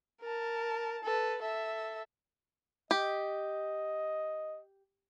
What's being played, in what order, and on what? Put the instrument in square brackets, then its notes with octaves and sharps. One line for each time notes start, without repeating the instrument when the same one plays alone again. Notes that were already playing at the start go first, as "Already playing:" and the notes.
[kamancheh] A#4 A5
A4 B4
A4 E5
[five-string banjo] G4 [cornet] D#5